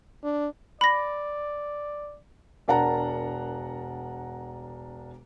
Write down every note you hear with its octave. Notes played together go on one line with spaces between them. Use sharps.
D4
D5 B5 A#6
E1 D4 A#4 F#5 A5 A#5